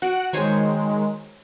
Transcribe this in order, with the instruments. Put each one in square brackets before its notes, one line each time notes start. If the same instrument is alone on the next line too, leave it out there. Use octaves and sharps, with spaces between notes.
[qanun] F#4 [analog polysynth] F#5 F#6 D7
[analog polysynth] D#3 G#3 [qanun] C5 C#5 G#5